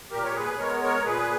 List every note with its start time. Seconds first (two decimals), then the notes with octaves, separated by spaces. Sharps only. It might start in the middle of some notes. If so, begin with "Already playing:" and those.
0.11 A#2 G4 A#4
0.24 C#5
0.35 G#4 B4
0.58 G#3 B3 A#4 C#5
0.81 A#4 C#5
1.05 A#2 G#4 B4